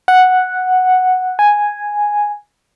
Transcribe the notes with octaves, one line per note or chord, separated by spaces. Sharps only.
F#5
G#5